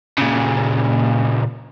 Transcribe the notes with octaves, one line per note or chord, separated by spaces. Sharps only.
A#2 C#3